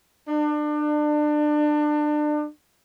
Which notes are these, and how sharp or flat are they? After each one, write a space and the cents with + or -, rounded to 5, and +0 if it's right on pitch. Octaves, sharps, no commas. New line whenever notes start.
D4 +30